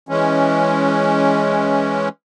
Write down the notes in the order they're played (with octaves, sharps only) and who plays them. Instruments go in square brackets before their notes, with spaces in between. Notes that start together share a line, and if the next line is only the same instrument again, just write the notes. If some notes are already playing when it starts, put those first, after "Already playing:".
[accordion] E3 G#3 C#4